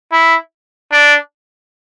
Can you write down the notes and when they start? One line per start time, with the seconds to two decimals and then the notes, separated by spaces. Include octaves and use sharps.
0.12 E4
0.92 D4